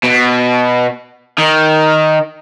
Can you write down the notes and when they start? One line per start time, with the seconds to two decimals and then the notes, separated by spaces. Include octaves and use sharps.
0.04 B2
1.39 D#3